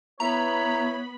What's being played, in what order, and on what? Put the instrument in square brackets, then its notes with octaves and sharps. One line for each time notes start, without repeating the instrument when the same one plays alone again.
[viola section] B3 B5 [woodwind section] E4 C#5 [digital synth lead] A#5